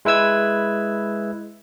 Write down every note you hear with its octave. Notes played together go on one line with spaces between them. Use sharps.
G#3 E4 B4 E6 G#6